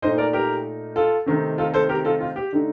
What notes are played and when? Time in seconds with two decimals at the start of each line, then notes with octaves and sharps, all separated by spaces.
0.02 A#2 A3 D#4 C5 D#5
0.18 A#4 D5
0.33 G4 A#4
0.96 F4 A4
1.26 C3 D#3 A3 C4 D#4
1.58 F4 A4
1.74 A4 C5
1.89 G4 A#4
2.05 F4 A4
2.20 F4
2.36 G4
2.52 D3 A3 D#4